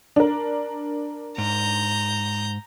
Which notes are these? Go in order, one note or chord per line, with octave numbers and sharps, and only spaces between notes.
D4 A#4
G#2 A#5 G6